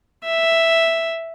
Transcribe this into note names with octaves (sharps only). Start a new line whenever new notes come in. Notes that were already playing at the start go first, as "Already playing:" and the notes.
E5